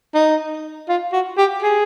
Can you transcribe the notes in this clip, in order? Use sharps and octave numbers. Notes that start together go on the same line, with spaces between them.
D#4
F4
F#4
G4
G#4